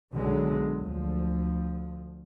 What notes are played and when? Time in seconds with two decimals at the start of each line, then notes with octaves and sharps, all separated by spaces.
0.13 B1 D3 F#3 G#3
0.77 D2 F3